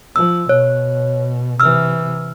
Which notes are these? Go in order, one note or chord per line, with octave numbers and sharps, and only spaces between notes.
F3 E6
B2 C#5
C3 E3 E6 F6